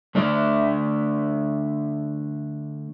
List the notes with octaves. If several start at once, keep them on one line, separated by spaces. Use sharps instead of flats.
D3 A3 D5